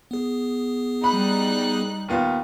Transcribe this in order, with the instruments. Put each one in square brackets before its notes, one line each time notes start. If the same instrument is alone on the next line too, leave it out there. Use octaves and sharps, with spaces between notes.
[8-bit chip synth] B3 G#4
[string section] G3 D#4 F#6 [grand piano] B5
[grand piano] D#2 B3 F4